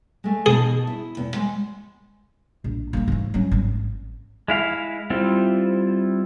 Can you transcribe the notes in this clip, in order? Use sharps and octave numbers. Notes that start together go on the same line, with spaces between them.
G#3 A3
B2 D#4 G#4 A5
E4
E2
G#3
A#1
A#3 D#4
G#2 A3
F#3 C#4
G#1
G#3 E4 F5
G3 C4 E4 F4